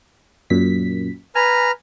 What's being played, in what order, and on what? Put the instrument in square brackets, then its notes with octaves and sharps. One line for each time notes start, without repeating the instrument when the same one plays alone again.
[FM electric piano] F#2 A#2 B6
[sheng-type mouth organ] B4 A#5 F6 [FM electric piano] G#5